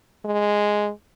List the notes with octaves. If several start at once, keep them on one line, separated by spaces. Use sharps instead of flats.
G#3